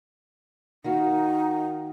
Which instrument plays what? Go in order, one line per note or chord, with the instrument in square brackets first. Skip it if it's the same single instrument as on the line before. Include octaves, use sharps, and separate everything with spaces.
[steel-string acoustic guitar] D#3 A#3 F#4 [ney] D#4